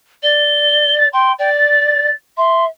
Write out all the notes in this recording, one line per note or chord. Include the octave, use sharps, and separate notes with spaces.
D5 G7
A6
G5 C6
D5 G5
A6
E5 C6